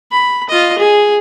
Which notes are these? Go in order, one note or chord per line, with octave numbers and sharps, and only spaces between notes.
B5
F4 D#5
G#4